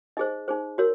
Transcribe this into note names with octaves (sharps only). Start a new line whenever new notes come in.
D#4 G#4 C5 D#5
D#4 G#4 C5
F#4 A#4 C#5